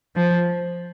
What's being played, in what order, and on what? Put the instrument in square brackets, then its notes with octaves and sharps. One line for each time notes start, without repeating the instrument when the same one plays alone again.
[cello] F3